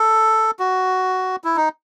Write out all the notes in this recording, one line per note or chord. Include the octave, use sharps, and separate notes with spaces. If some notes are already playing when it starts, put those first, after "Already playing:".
Already playing: A4
F#4
E4
D#4